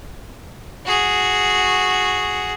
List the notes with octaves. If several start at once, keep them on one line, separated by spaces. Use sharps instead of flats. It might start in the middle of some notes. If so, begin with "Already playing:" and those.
F#4 G#4